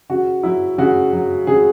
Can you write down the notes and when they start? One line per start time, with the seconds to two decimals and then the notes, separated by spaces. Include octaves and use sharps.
0.09 C#3 F#4
0.43 F#3 E4
0.78 C#3 F#4
1.13 F#3
1.47 C#3 G#4